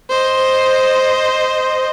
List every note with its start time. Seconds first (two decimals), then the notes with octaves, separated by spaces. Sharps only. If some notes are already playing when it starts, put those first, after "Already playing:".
0.10 C5 D#5